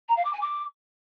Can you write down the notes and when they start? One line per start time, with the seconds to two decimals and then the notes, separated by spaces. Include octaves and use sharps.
0.08 A#5
0.16 F5
0.24 D6
0.32 G#5
0.41 D6